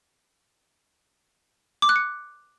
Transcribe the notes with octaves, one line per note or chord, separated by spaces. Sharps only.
D6
F#6
C#7